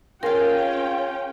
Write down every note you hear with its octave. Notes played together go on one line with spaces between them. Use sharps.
C#4 F4 G#4 A#4 F5 G5